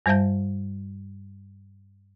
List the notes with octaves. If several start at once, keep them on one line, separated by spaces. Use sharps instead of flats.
G2 G3 C5 E5 A5 G6